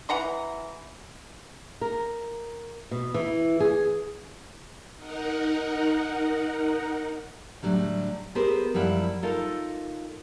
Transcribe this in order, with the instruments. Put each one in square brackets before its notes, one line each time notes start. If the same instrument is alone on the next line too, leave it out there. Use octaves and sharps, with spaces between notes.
[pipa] E3 F#5 A#5 C6
[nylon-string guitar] A#4
B2
E3
G#4
[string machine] D#4 A#4 F#5
[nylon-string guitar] A2 D3 F#3 G3
B3 G4 G#4 A#4 C5
F#2 F3 G3 E4 F#5
D#4 F4 A4 A#4